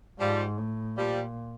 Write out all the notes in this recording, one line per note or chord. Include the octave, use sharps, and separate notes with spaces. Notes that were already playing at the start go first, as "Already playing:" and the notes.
G#2 F3 G3
A2
A#2 F3 G3